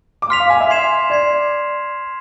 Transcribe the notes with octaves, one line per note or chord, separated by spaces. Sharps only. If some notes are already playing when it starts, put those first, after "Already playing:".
D6
C6 F6 B6 F7
F5
G#5
E5
C6 G#6 C7 E7
D5 C6 G#6 C7